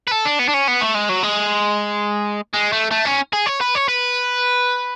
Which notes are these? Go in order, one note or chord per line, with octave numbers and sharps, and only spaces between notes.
B4
A4
D4
B3
D4
C#4
B3
A3
G#3
F#3
G#3
G#3
A3
A3
C#4
G#4
C#5
B4
C#5
B4